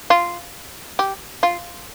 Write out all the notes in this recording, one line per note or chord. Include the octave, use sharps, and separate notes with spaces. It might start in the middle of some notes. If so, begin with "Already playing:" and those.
F4
G4
F4